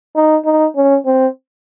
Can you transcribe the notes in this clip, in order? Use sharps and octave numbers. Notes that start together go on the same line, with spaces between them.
D#4
D#4
C#4
C4